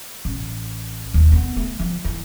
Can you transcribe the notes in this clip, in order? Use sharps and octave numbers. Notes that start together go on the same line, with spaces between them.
A1
D#2
B3
A3
F3
E3